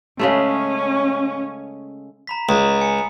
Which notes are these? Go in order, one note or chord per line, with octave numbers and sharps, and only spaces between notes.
C#3 G#3 A3 C#4
A#5 B5 B6
C#2 A#5 B5 D#6
G#5 C#7